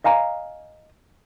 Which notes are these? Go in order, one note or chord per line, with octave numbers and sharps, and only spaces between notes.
D#5 F5 G#5 A#5